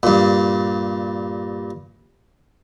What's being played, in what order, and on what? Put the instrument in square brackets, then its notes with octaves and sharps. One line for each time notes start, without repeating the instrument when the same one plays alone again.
[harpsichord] G2 A#2